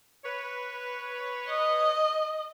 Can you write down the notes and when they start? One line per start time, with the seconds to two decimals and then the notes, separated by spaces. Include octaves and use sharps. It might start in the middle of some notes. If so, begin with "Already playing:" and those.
0.24 B4 C#5
1.49 D#5